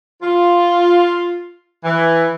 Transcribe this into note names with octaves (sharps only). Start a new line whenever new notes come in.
F4
E3